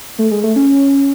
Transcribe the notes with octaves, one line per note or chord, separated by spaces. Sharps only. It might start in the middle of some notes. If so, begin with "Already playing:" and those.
A3
G#3
A3
C#4